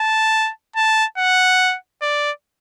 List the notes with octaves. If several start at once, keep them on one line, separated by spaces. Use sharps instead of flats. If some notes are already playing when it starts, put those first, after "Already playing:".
Already playing: A5
A5
F#5
D5